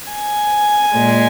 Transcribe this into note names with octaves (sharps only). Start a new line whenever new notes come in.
G#5
A#2 G#3